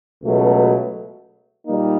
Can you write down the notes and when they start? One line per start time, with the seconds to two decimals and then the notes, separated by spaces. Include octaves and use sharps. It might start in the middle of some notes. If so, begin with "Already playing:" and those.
0.23 C#2 B2 F#3 A3
1.66 A#2 G3 A#3 D#4